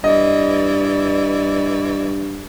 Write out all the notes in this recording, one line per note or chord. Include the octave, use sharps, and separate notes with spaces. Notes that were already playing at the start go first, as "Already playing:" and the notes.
G2 E3 D5 D#5